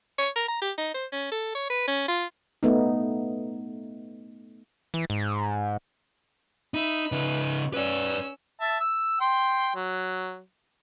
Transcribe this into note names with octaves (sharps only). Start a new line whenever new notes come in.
C#5
A#4
A#5
G4
D#4
C5
C#4
A4
C#5
B4
C#4
F4
A3 B3 D#4
E3
G#2
D#4 E5 B5
C#3 D#4 B4
C#4 B4 D5 E6
E5 A5
E6
G5 C6
F#3